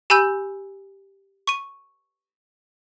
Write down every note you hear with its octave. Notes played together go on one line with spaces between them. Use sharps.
G4 G#5 B5 E6 G6 D#7
C#6 D#7